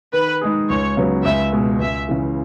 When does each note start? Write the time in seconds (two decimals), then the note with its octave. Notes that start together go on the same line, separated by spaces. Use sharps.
0.13 D#3 B4
0.41 G#3 D#4 G#4
0.69 C#2 C#5
0.97 C#3 F#3 B3
1.24 C#2 E5
1.53 B2 G#3
1.80 C#2 E5
2.09 C#3 E3